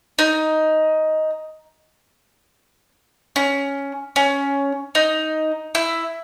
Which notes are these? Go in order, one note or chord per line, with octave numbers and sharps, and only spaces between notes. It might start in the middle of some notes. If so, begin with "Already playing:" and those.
D#4
C#4
C#4
D#4
E4